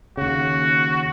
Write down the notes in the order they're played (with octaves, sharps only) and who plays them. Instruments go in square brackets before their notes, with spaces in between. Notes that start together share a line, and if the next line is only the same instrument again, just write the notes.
[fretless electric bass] D#2 C#3 [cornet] F#4